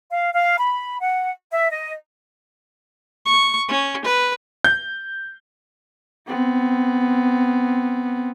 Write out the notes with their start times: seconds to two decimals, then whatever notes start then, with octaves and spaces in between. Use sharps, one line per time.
0.10 F5
0.33 F5
0.57 B5
1.00 F#5
1.51 E5
1.71 D#5
3.26 C#6
3.68 C#4
4.05 B4
4.64 G6
6.28 B3 C4